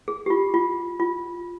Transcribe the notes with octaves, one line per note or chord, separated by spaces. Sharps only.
G#4
G4
F4
F4
F4